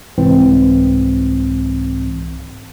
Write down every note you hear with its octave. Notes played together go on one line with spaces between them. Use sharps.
C2 G#2 E3 C4